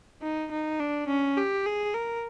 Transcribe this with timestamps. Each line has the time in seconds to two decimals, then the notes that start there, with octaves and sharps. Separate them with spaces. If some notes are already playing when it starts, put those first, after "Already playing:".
0.22 D#4
0.51 D#4
0.80 D4
1.08 C#4
1.37 G4
1.66 G#4
1.94 A#4